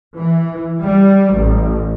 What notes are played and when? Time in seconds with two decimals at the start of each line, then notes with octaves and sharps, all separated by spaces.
0.16 E3
0.82 G3
1.34 A1